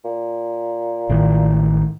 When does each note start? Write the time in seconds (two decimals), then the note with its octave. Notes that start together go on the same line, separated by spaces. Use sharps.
0.04 A#2
1.09 A1 A2 D#3